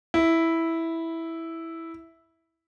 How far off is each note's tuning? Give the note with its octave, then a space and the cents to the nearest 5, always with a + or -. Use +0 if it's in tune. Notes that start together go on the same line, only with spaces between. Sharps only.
E4 -5